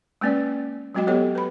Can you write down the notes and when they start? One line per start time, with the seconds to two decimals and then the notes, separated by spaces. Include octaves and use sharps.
0.21 G#3 A#3 C4 C#4 B4 D5
0.95 F#3 G#3 C4 F#4 D#5 G5
1.07 F#3 B3 G4 A4 C#5 D#5
1.35 B4 B5